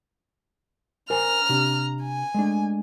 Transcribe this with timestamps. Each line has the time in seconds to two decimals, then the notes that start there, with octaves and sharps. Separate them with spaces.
1.10 A#4 C5 G#5 A#5 F6
1.49 C3 D4 G4
2.03 G#5
2.34 G#3 A3 D4